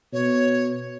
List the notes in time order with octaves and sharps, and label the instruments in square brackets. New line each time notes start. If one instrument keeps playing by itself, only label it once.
[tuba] B2 [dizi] C#5